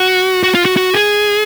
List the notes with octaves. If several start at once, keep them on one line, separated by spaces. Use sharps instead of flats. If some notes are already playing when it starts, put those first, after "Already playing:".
Already playing: F#4
F#4
F4
F#4
F#4
G#4